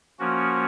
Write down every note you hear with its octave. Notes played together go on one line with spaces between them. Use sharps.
F3 A#3 C#4 F#4